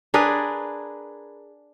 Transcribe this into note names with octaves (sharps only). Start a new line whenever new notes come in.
D4 G#4 A#4 B4